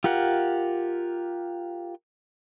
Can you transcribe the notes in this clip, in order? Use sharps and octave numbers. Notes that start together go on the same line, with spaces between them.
F4 G4 A#4 F#5